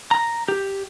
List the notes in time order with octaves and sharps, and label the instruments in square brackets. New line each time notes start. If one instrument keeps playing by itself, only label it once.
[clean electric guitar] A#5
G4